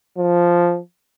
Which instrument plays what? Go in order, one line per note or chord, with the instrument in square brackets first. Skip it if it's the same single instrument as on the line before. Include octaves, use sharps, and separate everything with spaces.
[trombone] F3